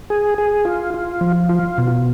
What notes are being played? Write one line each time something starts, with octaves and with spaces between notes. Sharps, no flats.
G#4
G#4
F4
F4
F3
F4
B2